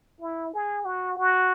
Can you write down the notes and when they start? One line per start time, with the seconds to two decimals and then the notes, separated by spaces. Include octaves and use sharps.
0.21 E4
0.54 G#4
0.85 F#4
1.18 F#4